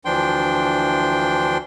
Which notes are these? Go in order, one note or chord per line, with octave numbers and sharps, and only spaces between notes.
D2 E3 F3 D4 G5 C6